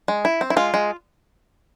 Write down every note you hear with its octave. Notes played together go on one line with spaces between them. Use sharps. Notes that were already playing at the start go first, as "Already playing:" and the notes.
G#3
E4
C4
E4
G#3 F4
G#3